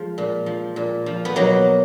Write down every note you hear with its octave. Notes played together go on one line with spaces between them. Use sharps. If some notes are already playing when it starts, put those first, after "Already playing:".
Already playing: F3 G#3
A#2
F3
A#2
F3
B3
B2 F#3 A#3